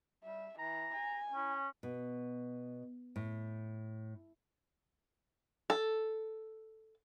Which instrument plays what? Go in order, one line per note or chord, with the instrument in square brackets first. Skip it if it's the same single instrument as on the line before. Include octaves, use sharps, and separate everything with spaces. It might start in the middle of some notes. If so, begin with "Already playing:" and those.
[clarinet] G3 [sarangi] E5
[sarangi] E3 [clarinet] A#5
[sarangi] G#5
[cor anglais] C#4 [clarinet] E4
[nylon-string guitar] B2
A2
[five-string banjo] A4